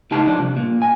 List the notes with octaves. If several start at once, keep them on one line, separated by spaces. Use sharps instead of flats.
C#2 A2 D#4 G4 A5
F3 D4
C2
A#2
G#5